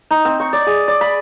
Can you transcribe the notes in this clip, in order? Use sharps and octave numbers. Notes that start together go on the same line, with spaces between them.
D#4
C4
C#6
D5
G#4
D5
B5